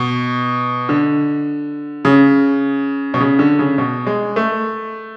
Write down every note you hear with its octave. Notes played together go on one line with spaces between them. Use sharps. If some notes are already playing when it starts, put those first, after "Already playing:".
Already playing: B2
D3
C#3
B2
C#3
D3
C#3
B2
G#3
A3